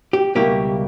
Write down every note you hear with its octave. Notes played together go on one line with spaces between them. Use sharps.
G4
C#2 B2 G3 A#3 E4 G4